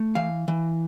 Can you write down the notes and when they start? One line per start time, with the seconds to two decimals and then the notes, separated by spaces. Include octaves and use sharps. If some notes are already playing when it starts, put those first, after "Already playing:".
Already playing: A3
0.15 E3 F5
0.48 E3